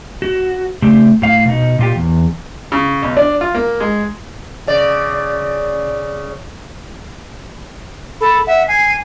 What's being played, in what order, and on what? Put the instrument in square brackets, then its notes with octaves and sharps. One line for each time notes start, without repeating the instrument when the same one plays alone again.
[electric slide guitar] F#4
C#3 A3 C4 G4
A2 F5
B2 D#4
A#2 F4 G4
E2
[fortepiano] C#3
B1
D4
F4
A#3
G#3
[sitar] C#3 D5
[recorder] A4 [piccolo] B5
[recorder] E5 [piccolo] F#5
[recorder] G#5 [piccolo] C7